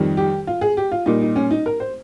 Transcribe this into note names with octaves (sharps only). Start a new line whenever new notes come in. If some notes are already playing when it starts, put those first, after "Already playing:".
Already playing: F2 D#3 G3
G4
F4
G#4
G4
F4
A#2 G3 D#4
D#4
C#4
D#4
A#4
C5